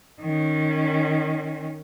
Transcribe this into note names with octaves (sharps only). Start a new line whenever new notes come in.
D#3 C#4